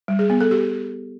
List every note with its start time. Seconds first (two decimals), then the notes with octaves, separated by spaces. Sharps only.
0.08 G3
0.19 G#4
0.30 B3
0.41 A4
0.51 G4